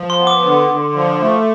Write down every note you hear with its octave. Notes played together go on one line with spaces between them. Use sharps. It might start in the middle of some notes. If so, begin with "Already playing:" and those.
Already playing: F3
C6
B3
D6
D3
D3
F3
A3